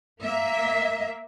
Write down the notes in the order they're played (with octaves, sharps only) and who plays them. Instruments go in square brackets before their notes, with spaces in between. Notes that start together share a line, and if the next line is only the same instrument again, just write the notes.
[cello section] A#3 E5